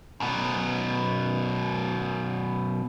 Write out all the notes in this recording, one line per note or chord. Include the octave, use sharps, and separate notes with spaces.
F#2 B2